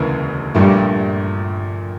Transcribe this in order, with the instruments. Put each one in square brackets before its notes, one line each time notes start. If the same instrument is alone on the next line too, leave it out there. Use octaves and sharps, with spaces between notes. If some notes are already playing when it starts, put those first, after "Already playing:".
Already playing: [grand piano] E1 D2 C#3 E3 A#3
[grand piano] A#1 A#2 A3 [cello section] G2 G3